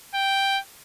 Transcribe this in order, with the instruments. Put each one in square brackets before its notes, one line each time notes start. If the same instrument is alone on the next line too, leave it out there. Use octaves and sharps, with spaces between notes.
[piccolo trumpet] G5